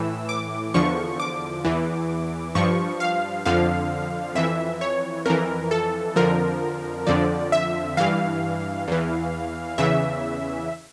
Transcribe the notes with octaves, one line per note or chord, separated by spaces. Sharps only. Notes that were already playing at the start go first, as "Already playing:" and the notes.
Already playing: A2 E3 E6
D6
E2 D3 F3 C#6
D6
E2 E3
G2 F3 C#6
F5
F2 D3 F3 F5
F2 E3 E5
C#5
F2 E3 A#4
A4
F2 D3 F3 A#4
F2 D3 F3 D5
E5
G2 E3 F5
E2 E3
E2 C#3 E3 E5